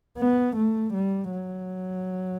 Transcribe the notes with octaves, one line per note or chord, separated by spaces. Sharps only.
B3
A3
G3
F#3